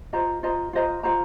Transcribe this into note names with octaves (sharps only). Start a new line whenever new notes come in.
F4 C5 D#5 A#5
F4 C5 D#5 A#5
F4 C5 D#5 A#5
F4 C5 D#5 A#5